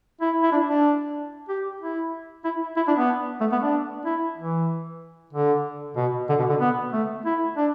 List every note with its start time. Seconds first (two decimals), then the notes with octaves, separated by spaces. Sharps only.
0.21 E4
0.42 E4
0.52 D4
0.68 D4
1.49 G4
1.81 E4
2.44 E4
2.76 E4
2.88 D4
2.98 B3
3.41 A3
3.52 B3
3.62 D4
4.06 E4
4.38 E3
5.33 D3
5.96 B2
6.29 D3
6.39 B2
6.50 D3
6.60 B3
6.93 A3
7.25 E4
7.57 D4